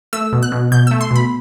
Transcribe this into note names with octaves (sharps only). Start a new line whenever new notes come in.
A3 E6
B2
F#6
B2
B2 G6
A3 E6
C6
B2 B5